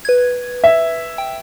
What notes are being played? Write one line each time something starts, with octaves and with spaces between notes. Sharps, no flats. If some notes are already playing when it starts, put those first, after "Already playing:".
B4 G#6
E5
G5